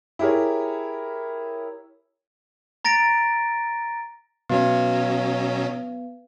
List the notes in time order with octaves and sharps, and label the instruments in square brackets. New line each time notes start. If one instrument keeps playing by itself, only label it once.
[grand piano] E4 G4 G#4 A#4 C#5
[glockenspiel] A#5 A6 A#6 D7
[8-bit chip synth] B2 F#3 C#4 [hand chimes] B3